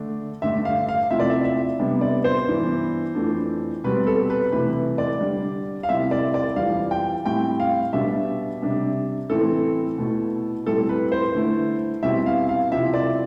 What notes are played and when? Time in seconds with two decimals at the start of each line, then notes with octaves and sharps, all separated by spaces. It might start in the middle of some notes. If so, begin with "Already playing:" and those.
Already playing: D3 A3 D4
0.42 G2 D3 A3 D4 E5
0.65 F5
0.89 F5
1.10 C3 F3 A3 C4 E4 E5
1.20 D5
1.30 E5
1.44 E5
1.79 C3 G3 B3 D4
2.01 D5
2.24 C5
2.47 G2 E3 B3 D4
3.15 F2 E3 A3 D4
3.84 B2 G3 C4 B4
4.07 A4
4.30 B4
4.52 C3 E3 A3 B4
4.98 D5
5.21 D3 G3 D4
5.83 F5
5.89 C3 G3 C4 E4 E5
6.11 D5
6.34 D5
6.56 F2 E3 G3 F5
6.91 G5
7.26 A2 G3 C4 E4 G5
7.60 F5
7.93 B2 G3 D4 E5
8.62 C3 G3 D4
9.30 A2 E3 A3 C4 E4 A4
9.98 B2 A3 E4
10.66 A2 G3 C4 E4 A4
10.89 B4
11.12 C5
11.35 D3 A3 E4
12.03 B2 G3 C4 E4 E5
12.26 F5
12.49 F5
12.71 C3 F3 C4 E4 E5
12.94 D5